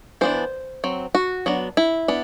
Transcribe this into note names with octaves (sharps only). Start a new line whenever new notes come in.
E3 B3 D4 C5
F#3 C4
F#4
F#3 B3 D4
E4
B3 D4